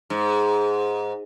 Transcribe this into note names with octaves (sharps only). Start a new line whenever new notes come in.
G#2